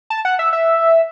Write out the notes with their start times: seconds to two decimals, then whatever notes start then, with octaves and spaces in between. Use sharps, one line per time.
0.10 A5
0.25 F#5
0.39 E5
0.53 E5